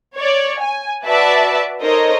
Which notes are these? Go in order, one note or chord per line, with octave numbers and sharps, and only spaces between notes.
C#5 D5
G#5
F#4 B4 D5 E5 A5
D#4 A4 A#4 C5 C#5 D#5